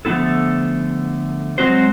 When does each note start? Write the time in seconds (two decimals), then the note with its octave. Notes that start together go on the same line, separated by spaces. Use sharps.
0.05 D3 F3 A3 B3 E4 A4
1.58 F#3 G#3 C4 D#4 F#4 C5